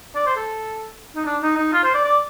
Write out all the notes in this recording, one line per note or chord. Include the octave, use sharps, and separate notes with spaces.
D5
C5
A4
D#4
D4
D#4
D#4
F4
C5
D5
D5